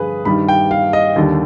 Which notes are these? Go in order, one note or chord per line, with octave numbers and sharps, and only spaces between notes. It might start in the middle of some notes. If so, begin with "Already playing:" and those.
Already playing: G2 D3 F3 G#4 B4
G2 D#3 G3 B5
G5
F5
D#5
D#2 D3 G3